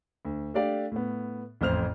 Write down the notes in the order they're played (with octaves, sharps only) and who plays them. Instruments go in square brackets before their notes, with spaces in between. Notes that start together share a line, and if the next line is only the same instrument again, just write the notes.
[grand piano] D2
A3 D4 G4 D5 F5
A2 B3
A1 F2 C5 F6 F7